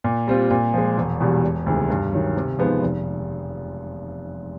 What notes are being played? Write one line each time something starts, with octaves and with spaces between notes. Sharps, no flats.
A#2
G3 C4 F4
A#2
F3 G#3
E1
E2 B2 G3
E1
D2 C3 D#3 G#3
G2
D#3 F#3
C3
F3 G#3 B3 D#4
F1